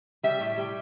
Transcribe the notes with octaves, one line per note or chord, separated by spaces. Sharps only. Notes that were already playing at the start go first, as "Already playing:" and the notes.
G3 E5
A2
G3